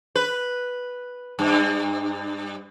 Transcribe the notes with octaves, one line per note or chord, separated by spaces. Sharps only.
B4
G2